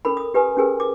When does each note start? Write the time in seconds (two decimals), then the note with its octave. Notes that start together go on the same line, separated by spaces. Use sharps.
0.05 C#4 A4 A#4 B5
0.17 D#6
0.34 G4 B4 G#5 D#6
0.57 C#4 G4 G#4 A#4 B4
0.80 D6